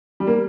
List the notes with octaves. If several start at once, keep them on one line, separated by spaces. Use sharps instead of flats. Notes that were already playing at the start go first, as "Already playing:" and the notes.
G3
A#3